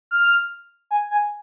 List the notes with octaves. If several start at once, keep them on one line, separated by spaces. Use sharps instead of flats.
F6
G#5
G#5